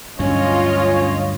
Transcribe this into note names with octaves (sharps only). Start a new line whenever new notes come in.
D2 G2 F#3 C#4 F4 C#5 D#5